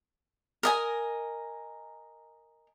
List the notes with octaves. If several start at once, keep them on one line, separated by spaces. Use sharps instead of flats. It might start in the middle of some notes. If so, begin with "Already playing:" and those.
A#4 D#5 G#5